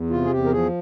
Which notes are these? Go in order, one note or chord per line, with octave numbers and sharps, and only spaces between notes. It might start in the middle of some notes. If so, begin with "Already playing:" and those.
Already playing: E2
C3 F4
G#4
E2 G4
A#4
F3 G#4